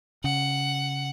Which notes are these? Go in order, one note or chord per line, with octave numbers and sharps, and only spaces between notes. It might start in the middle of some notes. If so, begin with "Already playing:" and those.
C#3 F#5